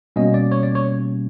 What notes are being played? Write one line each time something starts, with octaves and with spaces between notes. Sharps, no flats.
B2 G3 A#3 C#4 D#5
D5
C#5
D5
C#5